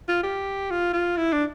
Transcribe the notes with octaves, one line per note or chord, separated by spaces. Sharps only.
F4
G4
F4
F4
E4
D4